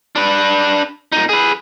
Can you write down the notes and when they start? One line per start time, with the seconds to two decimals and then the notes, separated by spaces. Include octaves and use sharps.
0.16 D4 B4
1.12 A#2 D#4
1.29 G#4 B4